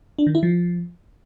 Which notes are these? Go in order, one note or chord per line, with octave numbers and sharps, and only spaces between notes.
D4
D#3
E4
F3